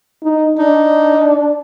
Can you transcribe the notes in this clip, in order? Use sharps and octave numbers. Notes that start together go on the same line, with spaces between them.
D#4
D4 D#4